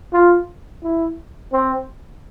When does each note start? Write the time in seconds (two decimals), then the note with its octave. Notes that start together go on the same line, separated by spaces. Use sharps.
0.13 F4
0.83 E4
1.52 C4